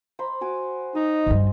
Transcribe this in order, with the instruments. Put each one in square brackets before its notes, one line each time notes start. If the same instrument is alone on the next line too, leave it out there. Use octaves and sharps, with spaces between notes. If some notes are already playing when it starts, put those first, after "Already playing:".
[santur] C5 A#5 B5
F#4 G#5 D6
[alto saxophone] D#4 [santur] D#5
[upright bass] G2 G3